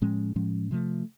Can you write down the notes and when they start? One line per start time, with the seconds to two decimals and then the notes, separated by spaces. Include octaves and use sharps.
0.02 A2 F3 G#3 C#4
0.36 A2 F3 G#3 C#4
0.71 C3 F3 A3